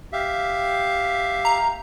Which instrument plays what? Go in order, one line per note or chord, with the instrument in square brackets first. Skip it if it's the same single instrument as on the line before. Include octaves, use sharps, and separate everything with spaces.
[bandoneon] G4 E5 F5
[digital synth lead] A#5